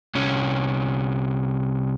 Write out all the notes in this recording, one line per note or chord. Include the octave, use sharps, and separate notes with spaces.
C2 C#4